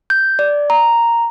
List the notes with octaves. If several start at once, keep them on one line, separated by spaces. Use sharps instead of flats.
G6
D5
A#5